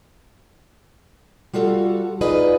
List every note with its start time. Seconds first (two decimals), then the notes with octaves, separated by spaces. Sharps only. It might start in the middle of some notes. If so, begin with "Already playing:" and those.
1.54 G3 F4 F#4 A4
2.21 D#4 F4 G#4 B4 D5 D#5